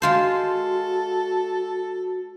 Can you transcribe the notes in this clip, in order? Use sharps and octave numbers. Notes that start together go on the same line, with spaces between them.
G#3 F4 F#4 A4 C5